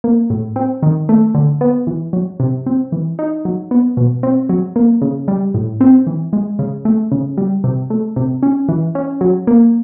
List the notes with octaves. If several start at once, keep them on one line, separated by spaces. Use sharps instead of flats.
A#3
A2
C4
D#3
A3
D3
B3
E3
F#3
C3
C4
E3
D#4
F#3
B3
B2
C4
F#3
A#3
C#3
G3
A2
C4
E3
G#3
C#3
A3
C#3
G3
C3
A3
C3
C#4
E3
C#4
F#3
A#3